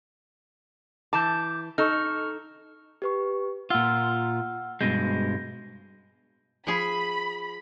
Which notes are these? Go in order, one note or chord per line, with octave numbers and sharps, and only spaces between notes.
E3 A5 D6 G6
D#4 A4 C#6 F6
G4 B4 C#6
A#2 F4 F#5 E6 F6
G2 B2 G#3 G6 A#6
F3 G#4 B5